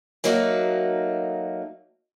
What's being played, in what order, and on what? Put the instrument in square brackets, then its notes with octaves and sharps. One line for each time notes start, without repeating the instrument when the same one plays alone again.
[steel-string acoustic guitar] F#3 A3 A#3 D#4 F#4